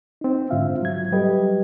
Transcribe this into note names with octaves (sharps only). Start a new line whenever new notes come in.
C4 D#4
G#2 D3 F4 E5 F5
F#3 G#6
F#3 G3 G4 A4 B4 D#5